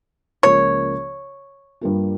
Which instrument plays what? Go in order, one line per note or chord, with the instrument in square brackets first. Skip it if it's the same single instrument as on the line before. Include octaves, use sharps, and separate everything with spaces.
[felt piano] C#2 C#3 F3 A#3 [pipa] C#5
[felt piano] G2 G3 A#3 F4